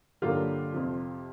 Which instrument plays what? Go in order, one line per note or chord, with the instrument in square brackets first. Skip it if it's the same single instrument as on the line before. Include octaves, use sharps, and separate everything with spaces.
[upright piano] G2 D3 F#3 A#3 D4 F4 G4
F2 C3 F3